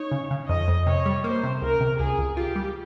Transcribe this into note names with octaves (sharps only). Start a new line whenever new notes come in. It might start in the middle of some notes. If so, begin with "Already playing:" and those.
Already playing: D#4 C#5
C#3
C#3
F2 D#5
F2
C3 C#5
G3
A#3 C5
C3
C#2 A#4
C3
C#2 G#4
C#2
F4 G4
G3